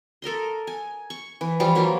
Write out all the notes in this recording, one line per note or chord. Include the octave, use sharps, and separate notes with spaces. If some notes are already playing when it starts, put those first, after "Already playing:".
A4 A#4 D#5 C6
G#5
C#6
E3
E3 F3 G3 F4
F#3 A#3 E4 F4